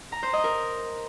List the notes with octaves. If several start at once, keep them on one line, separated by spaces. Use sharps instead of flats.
A#5
C5
D#5
A#4